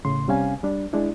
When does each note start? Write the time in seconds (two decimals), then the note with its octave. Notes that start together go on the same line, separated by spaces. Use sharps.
0.05 A2 C#3 C6
0.27 C2 C3 G3 C#4 F5 G#5
0.63 G3 D4
0.93 G#3 D4 E4